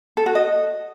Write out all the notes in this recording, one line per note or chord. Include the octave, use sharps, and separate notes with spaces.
A4
F#4
D#5